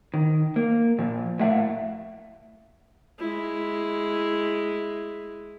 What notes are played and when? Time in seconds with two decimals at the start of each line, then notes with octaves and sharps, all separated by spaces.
0.14 D#3
0.56 A#3
0.98 A#2 F3
1.39 A2 A3 A#3 E5 F#5
3.19 G#3 E4